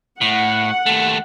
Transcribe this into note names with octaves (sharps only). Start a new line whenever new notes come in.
A2 F#5
D#2 A3